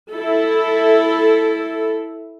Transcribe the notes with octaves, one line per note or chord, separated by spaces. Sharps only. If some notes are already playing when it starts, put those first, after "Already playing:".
E4 A4